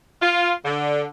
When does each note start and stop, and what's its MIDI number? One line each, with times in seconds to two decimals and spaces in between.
0.22 0.53 65
0.65 1.06 50